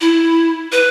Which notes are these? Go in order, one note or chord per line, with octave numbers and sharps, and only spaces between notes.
E4
B4